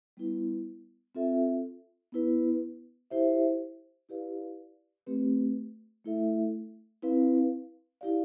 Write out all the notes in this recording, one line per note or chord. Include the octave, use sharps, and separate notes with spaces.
G3 B3 E4 B4
C4 F4 A4 E5
B3 E4 B4
E4 G4 C5 E5
E4 G4 B4 D5 F5
A3 C4 G4 B4
A3 E4 A4 E5
C4 E4 B4 F5
E4 G4 D5 F5